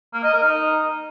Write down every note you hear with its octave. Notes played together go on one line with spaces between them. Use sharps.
A#3
D#5
A#4
D#4